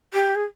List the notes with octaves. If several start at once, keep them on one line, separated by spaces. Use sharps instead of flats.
G4
G#4